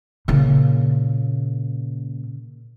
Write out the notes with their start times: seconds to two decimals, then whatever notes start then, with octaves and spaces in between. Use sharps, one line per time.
0.28 A#2 C#3